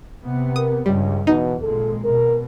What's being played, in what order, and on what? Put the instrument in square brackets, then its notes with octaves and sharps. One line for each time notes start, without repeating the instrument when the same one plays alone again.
[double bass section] C3 B3
[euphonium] A#4 [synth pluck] D#6
[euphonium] C#2 [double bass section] G2 C#3 [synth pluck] G3
[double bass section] E2 [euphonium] B2 [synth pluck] D#4
[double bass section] G#1 A#2 G#3 [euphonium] A4
[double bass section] B2 [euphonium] A#4